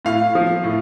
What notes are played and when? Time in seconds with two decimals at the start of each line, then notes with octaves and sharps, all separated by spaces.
0.05 A2 F5
0.35 F3
0.64 A2